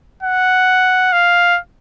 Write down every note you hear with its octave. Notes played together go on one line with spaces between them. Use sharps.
F#5
F5